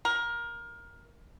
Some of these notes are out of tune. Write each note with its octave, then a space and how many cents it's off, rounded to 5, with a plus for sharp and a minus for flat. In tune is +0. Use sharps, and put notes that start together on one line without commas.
A#4 +20